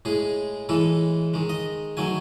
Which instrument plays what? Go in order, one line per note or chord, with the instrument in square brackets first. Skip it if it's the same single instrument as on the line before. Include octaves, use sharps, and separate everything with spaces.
[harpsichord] A2 G#3 G#4
A2 E3 G#3 A4
D#3 G#3
D#5
D#3 F#3 A3 G#5